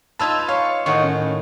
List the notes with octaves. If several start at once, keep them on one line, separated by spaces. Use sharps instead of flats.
D#4 F4 B4 A5 E6 G#6
C#5 F5
A2 D#3 D#5 F#5 C#6
C#4